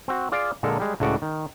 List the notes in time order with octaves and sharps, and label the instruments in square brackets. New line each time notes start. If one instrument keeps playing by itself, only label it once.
[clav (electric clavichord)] C4 F#4
F4 G#4 D5 F5
A#2 D3 G#3 A4 A#4
G3 G#3
C#2 A2 C#3 F#4 D5
D#3